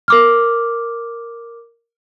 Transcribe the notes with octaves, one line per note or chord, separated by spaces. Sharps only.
A#4 D6 F6